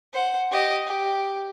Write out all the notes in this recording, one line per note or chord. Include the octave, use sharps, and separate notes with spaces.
C5 F#5
G4 D#5
G4